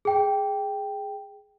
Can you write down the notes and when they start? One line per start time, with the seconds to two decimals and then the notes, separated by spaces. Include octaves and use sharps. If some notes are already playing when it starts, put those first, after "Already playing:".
0.05 G#4 G5